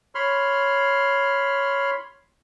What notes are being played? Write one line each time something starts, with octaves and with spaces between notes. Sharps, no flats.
C#5 B5 C6 F6